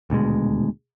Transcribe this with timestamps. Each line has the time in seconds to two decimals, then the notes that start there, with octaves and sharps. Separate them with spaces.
0.10 D#1 D2 B2 G#3